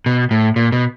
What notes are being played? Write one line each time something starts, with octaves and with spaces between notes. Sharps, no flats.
B2
A2
A#2
B2